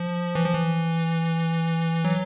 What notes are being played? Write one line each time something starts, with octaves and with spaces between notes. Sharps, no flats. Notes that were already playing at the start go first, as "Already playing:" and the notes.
Already playing: F3
E3
F3
E3
F#3